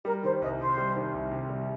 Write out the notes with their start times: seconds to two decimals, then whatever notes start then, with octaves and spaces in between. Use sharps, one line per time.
0.05 G3 A#4
0.23 D#3 C5
0.41 C2 D#5
0.60 C3 C5
0.77 G3
0.96 D#3
1.14 C2
1.32 C3
1.50 G3